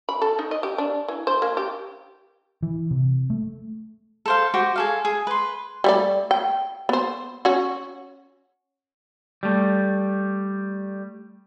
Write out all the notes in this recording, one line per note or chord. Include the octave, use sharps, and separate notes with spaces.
B5
A4
D#4
D#5
G4
D4
E3
C5
A#3
G4
E3
C3
A3
A4 C5 F5
F#4 G4 C5
G#4 A4 F5
G#4
B4 C6
G3 A3 D5
G5
B3 C5
C#4 F#4
G3 A3